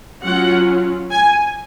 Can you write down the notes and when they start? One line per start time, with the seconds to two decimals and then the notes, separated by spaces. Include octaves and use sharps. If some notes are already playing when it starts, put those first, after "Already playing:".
0.22 F#3 C#4 F4 F#5
1.10 G#5